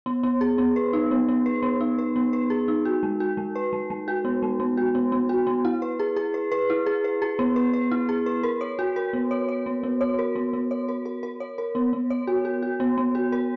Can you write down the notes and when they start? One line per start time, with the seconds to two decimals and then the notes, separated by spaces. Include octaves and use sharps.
0.06 B3
0.23 B3
0.41 G#4
0.58 B3
0.76 B4
0.93 D#4
1.11 B3
1.29 B3
1.46 B4
1.63 B3
1.81 D#4
1.98 B4
2.16 B3
2.33 B4
2.50 G#4
2.68 D#4
2.85 F#4
3.03 G#3
3.20 F#4
3.37 G#3
3.56 B4
3.73 G#3
3.90 G#3
4.08 F#4
4.25 B3
4.42 G#3
4.60 B3
4.77 F#4
4.95 B3
5.12 B3
5.29 F#4
5.47 B3
5.65 E4
5.82 B4
5.99 G#4
6.16 G#4
6.34 B4
6.52 B4
6.70 E4
6.86 G#4
7.04 B4
7.22 G#4
7.39 B3
7.56 B4
7.73 B4
7.91 E4
8.09 G#4
8.26 B4
8.43 A#4
8.61 C#5
8.79 F#4
8.96 A#4
9.13 B3
9.31 C#5
9.49 C#5
9.66 B3
9.83 B3
10.01 C#5
10.19 A#4
10.35 B3
10.53 B3
10.71 C#5
10.88 A#4
11.05 A#4
11.23 A#4
11.40 C#5
11.58 A#4
11.75 B3
11.93 B3
12.10 C#5
12.27 F#4
12.45 F#4
12.62 F#4
12.80 B3
12.98 B3
13.15 F#4
13.32 A#4